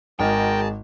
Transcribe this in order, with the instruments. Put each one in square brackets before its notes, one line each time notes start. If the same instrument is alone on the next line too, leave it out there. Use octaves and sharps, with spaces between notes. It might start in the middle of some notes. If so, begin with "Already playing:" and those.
[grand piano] G#1 [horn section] G#3 A#4 [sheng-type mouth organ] F#4 G#4 A5 [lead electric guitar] G5